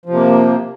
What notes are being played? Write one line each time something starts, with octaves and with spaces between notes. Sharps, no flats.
C3 F3 A#3